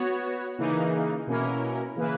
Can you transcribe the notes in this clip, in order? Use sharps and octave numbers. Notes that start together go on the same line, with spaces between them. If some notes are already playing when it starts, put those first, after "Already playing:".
Already playing: B3 F#4 C#5
C#3 E3 A#3 D#4
B2 A#3 C#4 E4 A#4
C#3 E3 A#3 E4 B4